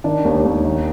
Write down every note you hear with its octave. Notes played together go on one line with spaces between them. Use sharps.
D#3 D4
D#2
D#2
D#3